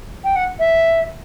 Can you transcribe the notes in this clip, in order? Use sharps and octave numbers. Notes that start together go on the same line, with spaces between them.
G5
F#5
E5